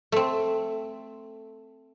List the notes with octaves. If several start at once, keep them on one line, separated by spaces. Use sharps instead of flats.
A3 C4